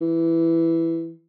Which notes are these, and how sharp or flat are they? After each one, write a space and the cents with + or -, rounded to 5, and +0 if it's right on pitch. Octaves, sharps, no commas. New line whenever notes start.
E3 +5